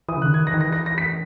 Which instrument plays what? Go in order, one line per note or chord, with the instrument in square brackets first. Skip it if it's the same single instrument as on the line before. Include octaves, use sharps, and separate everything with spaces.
[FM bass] E3 [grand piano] D#6
[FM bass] C#3
[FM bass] D#3 [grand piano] F#6
[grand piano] G#6
[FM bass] E3 [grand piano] A#6
[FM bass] D#3
[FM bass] E3 [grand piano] A#6
[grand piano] A#6
A#6
B6